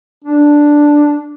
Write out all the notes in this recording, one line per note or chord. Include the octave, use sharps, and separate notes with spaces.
D4